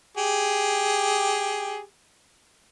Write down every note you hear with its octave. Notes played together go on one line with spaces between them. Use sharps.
G4 G#4